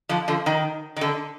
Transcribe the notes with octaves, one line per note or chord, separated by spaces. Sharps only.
D3 F3
D3 F3
D#3
D#3
D3